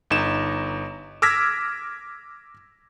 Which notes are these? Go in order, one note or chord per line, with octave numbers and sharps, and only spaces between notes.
G1 D#4 E7
D6 E6 F6 G#6 A#6 B6